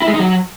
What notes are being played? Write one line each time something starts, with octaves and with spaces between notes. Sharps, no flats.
E4
G#3
D#4
F#3